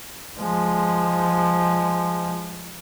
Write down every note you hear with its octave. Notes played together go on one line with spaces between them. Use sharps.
F3 G#3